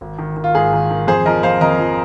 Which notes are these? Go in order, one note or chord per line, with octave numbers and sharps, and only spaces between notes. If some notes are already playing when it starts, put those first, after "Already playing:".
G#1
D#3
D#3
F4
G#2 G#4
D#3
D#3
F2 G#4 C5
F3 A#4 D#5
F2 C5 F5
F2 A#4 D#5
F3